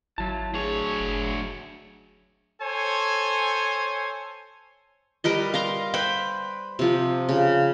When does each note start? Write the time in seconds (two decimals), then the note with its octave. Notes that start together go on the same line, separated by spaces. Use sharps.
0.18 G#1 F#3 E4 A5
0.54 D2 G#4 C#5
1.00 F#1
2.62 A4 C5 C#5 G#5
5.24 G3 A#4 B4 D#5
5.54 F5 A#5 C6
5.94 B4 C5 G5 B5
6.79 C3 F3
7.29 C#3